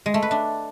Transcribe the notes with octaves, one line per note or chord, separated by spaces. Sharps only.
G#3
A3
B4
D4